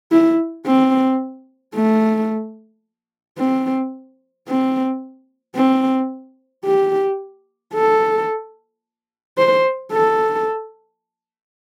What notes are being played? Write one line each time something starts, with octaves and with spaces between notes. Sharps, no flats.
E4
C4
A3
C4
C4
C4
G4
A4
C5
A4